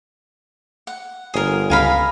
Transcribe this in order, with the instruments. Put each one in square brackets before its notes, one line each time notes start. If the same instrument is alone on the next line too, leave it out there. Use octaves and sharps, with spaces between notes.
[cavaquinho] F#5
[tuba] G1 [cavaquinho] G#4 A#4
[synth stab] C#2 F5 [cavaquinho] G#5 A#5 B5